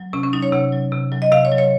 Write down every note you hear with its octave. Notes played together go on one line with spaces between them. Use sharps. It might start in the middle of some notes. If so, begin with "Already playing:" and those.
Already playing: F#3
C3 C#4
C#4
F#3 D#4
C#5
C3 F#5
F#3
C3
F#3
D#5
C3 F5
C#5
F#3
C#5